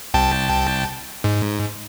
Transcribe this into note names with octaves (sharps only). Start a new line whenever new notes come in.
C2 G5 A5
G#2